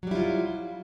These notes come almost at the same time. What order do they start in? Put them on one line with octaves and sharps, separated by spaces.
F#3 G3 E4 F4